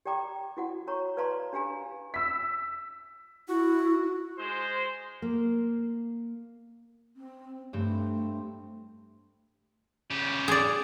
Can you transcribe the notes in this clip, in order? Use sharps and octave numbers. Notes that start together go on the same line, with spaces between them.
G4 D5 G5 A#5 D6
E4 F#4 F#5
F#4 C#5 A#5 C#6
B4 D5 F5 A5 A#5 C6
D4 G4 F5 G#5 A#5
E6 B6
E4 F#4
G#3 C5
A#3
C4
G2 A3 C4
C#3 G4
G#4 D5